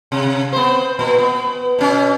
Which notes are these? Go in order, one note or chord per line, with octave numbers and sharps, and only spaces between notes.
C3
B3 C5
A#2
B3
B2 C#4